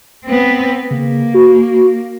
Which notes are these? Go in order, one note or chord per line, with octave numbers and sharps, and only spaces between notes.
B3 C4
C#3 A#3
F#4